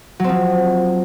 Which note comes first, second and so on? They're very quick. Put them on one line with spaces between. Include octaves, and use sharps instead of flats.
F#3 C4 F3